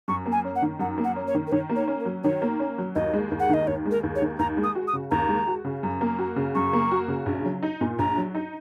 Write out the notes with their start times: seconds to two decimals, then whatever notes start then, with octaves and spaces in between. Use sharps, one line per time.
0.08 F#2 C#6
0.26 A#3
0.32 G#5
0.44 C#4
0.56 F#5
0.62 D#3
0.79 F#2 F#5
0.98 A#3
1.04 F#5
1.16 C#4
1.27 C#5
1.34 D#3
1.47 A#4
1.52 D#3 C#5
1.69 A#3
1.76 C#5
1.88 C#4
2.00 A#4
2.05 F#3
2.24 D#3 C#5
2.42 A#3
2.59 C#4
2.78 F#3
2.95 D#2 D#5
3.13 G#3
3.31 D#2
3.40 F#5
3.49 D#3 D#5
3.67 D#2 C#5
3.86 G#3
3.91 A#4
4.03 D#2
4.16 C#5
4.22 D#3
4.39 D#2 A#5
4.57 G#3
4.64 D#6
4.75 F#4
4.88 D#6
4.93 C#3
5.11 D#2 A#5
5.29 G#3
5.47 F#4
5.65 C#3
5.83 F#2
6.01 A#3
6.18 F#4
6.36 C#3
6.55 F#2 C#6
6.73 A#3
6.91 F#4
7.08 C#3
7.26 A#1
7.45 F#3
7.63 D#4
7.81 A#2
7.99 A#1 A#5
8.17 F#3
8.35 D#4